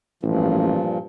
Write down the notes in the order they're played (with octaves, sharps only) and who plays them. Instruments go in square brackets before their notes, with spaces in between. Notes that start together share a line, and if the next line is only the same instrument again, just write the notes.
[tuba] A1 [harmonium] G2 A#2 F3